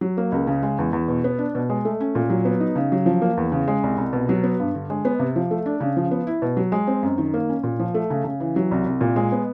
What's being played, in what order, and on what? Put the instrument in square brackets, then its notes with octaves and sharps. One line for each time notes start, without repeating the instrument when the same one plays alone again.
[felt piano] F#3
A#3
C#2
C#3
G#3
E2
E2
B2
B3
D4
B2
G#3
A3
C#4
A#2
F#3
B3
D#4
C#3
F#3
F3
A#3
E2
C#3
G#3
C2
C2
B2
F#3
B3
G2
D3
G#3
B3
C3
F3
A3
D4
C#3
F3
B3
E4
B2
F#3
G#3
C4
F#2
D#3
A#3
C#4
A#2
F3
A3
C#3
C#3
E3
F#3
C2
C2
A#2
G#3
B3